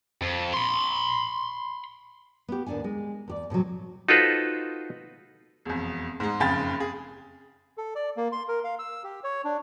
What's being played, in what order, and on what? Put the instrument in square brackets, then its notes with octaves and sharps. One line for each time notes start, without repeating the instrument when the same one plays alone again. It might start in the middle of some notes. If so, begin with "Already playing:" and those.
[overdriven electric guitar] F2
B5 C6
[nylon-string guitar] B3 G4
D#2 A2 D4 F#5 G#5
G#3
E2 G4 D5
A2 C3 E3 F#3
[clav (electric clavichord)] D#4 F4 F#4 A4 B4 C5
[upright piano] E1 F2
G#2 G#3
F#1 F2 C#3 G5 B5 A6
G#4
[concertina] A4
D5
A#3
C6
A#4
F5
E6
G4
C#5
D4